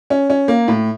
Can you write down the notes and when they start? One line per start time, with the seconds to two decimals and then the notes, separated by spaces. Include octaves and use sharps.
0.10 C#4
0.30 C#4
0.48 A#3
0.68 A2